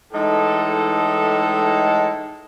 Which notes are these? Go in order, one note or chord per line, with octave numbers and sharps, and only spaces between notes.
A2 E3 G#3 D#4 A4